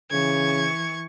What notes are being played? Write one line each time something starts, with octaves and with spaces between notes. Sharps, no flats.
C#3 E3 C#6 G#6